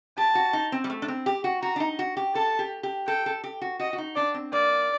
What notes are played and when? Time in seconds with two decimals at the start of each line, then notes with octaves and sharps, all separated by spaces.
0.17 G4 A5
0.35 F#4
0.53 D#4
0.72 C4
0.84 G3
0.90 A3
1.02 D4
1.08 C4
1.26 G4
1.44 F#4
1.62 F#4 A#5
1.76 D4
1.80 D#4
1.99 F#4
2.17 G4
2.34 A4 A5
2.59 G4
2.83 G4
3.07 A4 G5
3.26 A4
3.44 G4
3.61 F#4
3.79 F#4 D#5
3.93 F#4
3.98 D#4
4.15 D4 D5
4.34 C4
4.52 A#3 D5